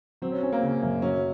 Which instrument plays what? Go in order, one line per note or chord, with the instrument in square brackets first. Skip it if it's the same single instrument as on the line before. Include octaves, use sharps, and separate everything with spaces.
[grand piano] F#3 [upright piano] C4
[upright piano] C#4
[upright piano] C4 [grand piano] C#4
[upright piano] A#3
[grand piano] C#3
F#2
[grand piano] F#3 [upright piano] C#4